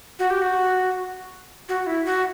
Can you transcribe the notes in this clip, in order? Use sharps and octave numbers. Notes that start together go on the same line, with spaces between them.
F#4
G4
F#4
F#4
E4
F#4